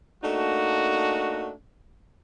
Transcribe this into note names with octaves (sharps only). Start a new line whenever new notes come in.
A3 A#3 D4 D#4 F#4